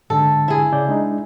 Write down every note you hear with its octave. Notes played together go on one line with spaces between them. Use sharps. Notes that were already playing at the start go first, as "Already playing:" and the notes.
G#2 D3 A4
E4 G#4
C#3 D5 G6
G#3 D4 D#4